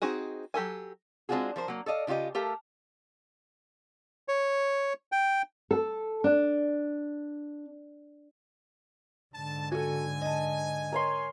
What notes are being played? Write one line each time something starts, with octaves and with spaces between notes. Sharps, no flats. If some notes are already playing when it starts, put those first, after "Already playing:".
C4 D#4 F#4 G#4
F#3 G4 A4 G#5
G#3 C4 D4 F4 F#4 G#4
F3 A#4 C5
F#3 A#3
A4 D5 D#5 F5
C#3 D4 F4 G4 D#5
A3 G4 A4 A#4 F5
C#5
G5
A4
D4
G#2 D3 A5
F#4 A4 G#5
D#5 A5
A#4 C#5 C6